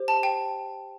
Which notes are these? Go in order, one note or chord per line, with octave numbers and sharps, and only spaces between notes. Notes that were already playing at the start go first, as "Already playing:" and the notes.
Already playing: G4 C5
A5
G5